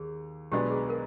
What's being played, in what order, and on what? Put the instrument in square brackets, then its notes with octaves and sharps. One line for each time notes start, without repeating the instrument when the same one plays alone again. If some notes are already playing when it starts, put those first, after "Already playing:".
Already playing: [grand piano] D#2 [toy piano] G#4
[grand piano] B1 B2 G#3 B3 D4 [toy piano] G4
[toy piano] G#4
A#4